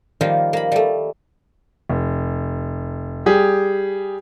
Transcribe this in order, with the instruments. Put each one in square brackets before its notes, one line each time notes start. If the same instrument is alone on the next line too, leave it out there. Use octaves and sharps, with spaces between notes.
[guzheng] D#3 F3 G3 A#3 F4
A#3 B5
G3 A3
[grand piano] F1
G3 G4 G#4